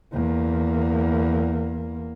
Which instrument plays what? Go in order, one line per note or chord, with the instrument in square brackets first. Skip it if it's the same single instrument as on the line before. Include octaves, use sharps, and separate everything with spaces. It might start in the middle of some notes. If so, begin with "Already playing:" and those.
[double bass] E2 A#3